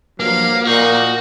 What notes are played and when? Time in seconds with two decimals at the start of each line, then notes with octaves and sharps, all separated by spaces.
0.20 G2 F3 F#3 A#3 F5
0.67 A#2 D#4 F#4